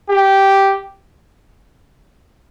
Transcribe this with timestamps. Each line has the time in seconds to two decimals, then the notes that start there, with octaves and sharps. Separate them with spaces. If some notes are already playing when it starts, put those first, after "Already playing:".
0.10 G4